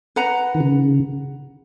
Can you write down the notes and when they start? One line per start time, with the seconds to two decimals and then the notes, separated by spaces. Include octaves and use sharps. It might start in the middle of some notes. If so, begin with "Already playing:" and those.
0.16 B4 F#5 A#5
0.54 D#3
0.60 C#3